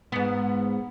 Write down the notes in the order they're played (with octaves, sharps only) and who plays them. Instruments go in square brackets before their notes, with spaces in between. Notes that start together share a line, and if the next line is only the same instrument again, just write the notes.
[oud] G#2 B3